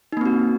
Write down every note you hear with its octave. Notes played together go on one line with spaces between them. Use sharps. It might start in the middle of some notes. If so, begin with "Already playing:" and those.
A#3 C4 D#4 F#4